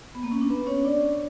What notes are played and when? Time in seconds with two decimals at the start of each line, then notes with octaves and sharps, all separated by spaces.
0.15 B3
0.23 A#3
0.31 C#4
0.41 D4
0.50 B3 B4
0.67 C#4 C#5
0.85 D4 D5